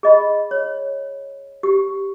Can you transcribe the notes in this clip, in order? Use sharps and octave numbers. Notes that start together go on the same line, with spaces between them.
G#4 D#5 B5
C#5
G4